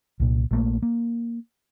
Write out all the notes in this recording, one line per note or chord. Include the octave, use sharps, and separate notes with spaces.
C2 A#2
A#1 A3 A#3
A#3